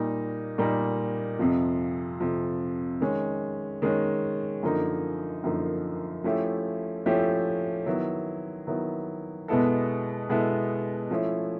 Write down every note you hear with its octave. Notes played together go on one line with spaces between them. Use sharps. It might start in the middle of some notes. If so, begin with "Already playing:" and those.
Already playing: A#2 G3 A#3 D#4
A#2 G3 A#3 D#4
F2 C3 F3
F2 C3 F3
D#3 G#3 C#4
D#3 G#3 C#4
F#2 D3 F3 A#3 D#4
F#2 D3 F3 A#3 D#4
F3 A3 C#4 E4 G4
F3 A3 C#4 E4 G4
D#3 F#3 B3 E4
D#3 F#3 B3 E4
B2 G#3 B3 E4 A4
B2 G#3 B3 E4 A4
F3 A3 C#4 E4